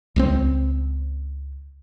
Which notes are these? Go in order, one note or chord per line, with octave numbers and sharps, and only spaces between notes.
C#2 G#3 C4